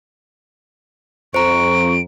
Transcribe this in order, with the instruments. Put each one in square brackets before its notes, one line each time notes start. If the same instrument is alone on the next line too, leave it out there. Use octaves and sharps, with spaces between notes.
[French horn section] F2 [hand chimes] C5 A#5 [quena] C#6 [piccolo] D7